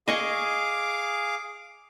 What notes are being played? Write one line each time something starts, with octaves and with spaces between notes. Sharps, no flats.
G#4 D#5 F5 G#5 C#6 D6